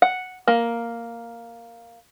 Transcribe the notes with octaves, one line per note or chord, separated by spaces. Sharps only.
F#5
A#3